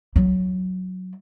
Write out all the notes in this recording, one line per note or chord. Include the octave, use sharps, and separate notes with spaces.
F#3 E4